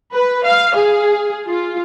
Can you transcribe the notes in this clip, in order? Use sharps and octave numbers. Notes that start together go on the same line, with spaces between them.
B4
F5
G#4
F4